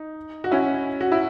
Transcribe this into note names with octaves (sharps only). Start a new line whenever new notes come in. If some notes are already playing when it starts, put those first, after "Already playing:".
Already playing: D#4
F#4
C#4 E4
F#4
E4